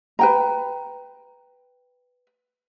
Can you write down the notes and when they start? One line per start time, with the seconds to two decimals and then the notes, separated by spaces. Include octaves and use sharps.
0.19 B4 G5 A#5